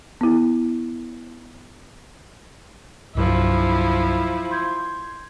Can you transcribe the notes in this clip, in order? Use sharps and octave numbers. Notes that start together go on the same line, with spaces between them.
B3 E4
C2 G2 F3 F#3 E4
C6 G6 G#6